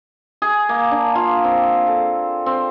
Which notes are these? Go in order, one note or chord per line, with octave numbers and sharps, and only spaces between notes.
G#4
A#3
D4
F4
C4
A4
C4